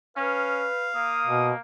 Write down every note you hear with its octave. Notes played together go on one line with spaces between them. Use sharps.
C#4 B4 F5
A#3 D#6
B2